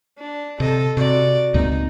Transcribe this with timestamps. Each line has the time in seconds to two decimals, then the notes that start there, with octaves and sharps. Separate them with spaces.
0.19 D4
0.60 C3 A4 D#5
0.97 C3 F#4 D5
1.54 C#2 A#2 C4 D#4